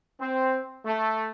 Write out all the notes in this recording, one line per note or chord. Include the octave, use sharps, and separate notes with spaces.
C4
A3